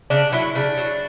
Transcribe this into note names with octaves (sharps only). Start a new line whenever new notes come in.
C#3 D4
F#3 E4
C#3 D4
F#3